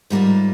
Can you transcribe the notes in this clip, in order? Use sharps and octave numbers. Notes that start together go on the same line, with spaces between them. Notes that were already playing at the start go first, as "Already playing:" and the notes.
G#2 G3 A#3 F4 E5